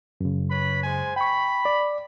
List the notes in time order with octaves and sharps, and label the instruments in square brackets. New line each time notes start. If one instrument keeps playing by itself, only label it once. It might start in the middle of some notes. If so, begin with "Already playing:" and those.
[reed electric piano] F#2 C#3
[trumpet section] B4 C#5 B5
G#3 C5 G#5
[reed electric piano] G5 C#6 [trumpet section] B5
[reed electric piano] D5